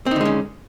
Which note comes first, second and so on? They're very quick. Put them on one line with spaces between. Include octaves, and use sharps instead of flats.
C4 D#4 D3 G#3 C#4